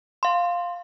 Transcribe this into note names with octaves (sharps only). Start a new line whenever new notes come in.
F5 C6